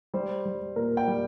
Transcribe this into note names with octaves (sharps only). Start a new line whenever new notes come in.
G3 C5
G3
A#2 A#4
G5
G3